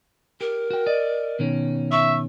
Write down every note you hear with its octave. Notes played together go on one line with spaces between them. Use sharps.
G4 A#4
F#4 G5
D5 D#5
B2 D#3 C#4
E5 C#6